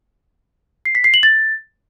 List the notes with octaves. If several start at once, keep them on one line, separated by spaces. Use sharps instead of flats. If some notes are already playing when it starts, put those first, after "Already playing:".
C7
B6
C7
F#7
A6